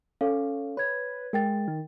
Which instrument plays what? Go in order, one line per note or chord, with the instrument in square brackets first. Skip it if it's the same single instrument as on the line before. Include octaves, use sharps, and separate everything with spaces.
[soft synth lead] C#4 [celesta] A4 F5
[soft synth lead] B4 [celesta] C#5 G#6
[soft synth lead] G#3 [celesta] A#4 G5 A6
[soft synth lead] D#3